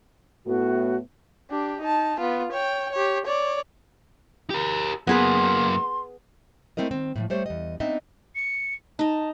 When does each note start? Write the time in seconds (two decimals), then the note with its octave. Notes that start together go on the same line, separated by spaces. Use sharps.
0.46 A2 A3 B3 F#4
1.50 D4 G4
1.81 D#4 A5
2.20 B3 F4
2.52 C#5 G5
2.93 G4 C#5
3.26 C#5 D5
4.50 G4 A#4
5.07 F#2 A#3 B3 G#4 B4 C6
6.77 A3 C4 E4 A#4 D#5
6.91 D#3 C4
7.16 A2 D#3 F3
7.30 G3 A3 C5 C#5
7.46 E2 D#5
7.80 B3 C4 D4 D#4 D#5 E5
8.35 C#7
8.99 D#4 D#5 A5